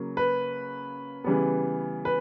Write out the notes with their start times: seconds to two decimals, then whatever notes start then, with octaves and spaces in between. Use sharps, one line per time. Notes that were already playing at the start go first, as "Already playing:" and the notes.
Already playing: C#3 F#3 A#3
0.17 B4
1.24 C#3 E3 G3 B3
2.05 B4